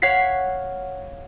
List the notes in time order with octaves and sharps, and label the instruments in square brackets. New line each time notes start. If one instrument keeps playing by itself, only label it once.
[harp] C#5 F5 F#5 B6 C7